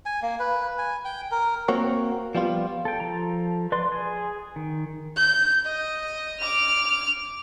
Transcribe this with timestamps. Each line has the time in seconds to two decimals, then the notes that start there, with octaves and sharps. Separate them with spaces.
0.06 G#5
0.22 A#3
0.39 B4
0.78 G#5
1.05 G5
1.31 A#4
1.68 A#3 C4 F#4 C#5
2.35 F3 G3 B3 F4
2.85 A4 G5
3.00 F3 A4 A#5
3.72 B4 D5 C6
3.92 G#4 G#5
4.56 D#3
5.17 G6
5.65 D#5
6.40 D6 F6